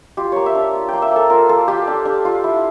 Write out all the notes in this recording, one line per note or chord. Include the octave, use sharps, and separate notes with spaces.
F4 G4
A#3 C#5
E5
D4
F4
A#3 G5
E5
A#3 A4
F4 A#4
F4 A4
F4 G4
D4
D4
F4
E4